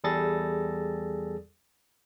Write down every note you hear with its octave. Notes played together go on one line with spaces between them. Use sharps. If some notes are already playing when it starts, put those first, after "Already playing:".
E2 G3 G#4 A4 A6 A#6